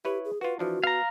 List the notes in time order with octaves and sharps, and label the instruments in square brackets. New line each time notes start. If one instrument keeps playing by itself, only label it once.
[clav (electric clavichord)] E4 B4 C#5 [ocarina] G4
[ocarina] G#4
[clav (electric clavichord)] F4 F#4 [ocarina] B4
[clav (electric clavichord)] E3 F3 D4 [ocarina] F#4
[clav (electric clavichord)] B3 [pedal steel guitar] F5 A#5